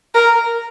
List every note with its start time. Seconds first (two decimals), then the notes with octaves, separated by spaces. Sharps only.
0.15 A#4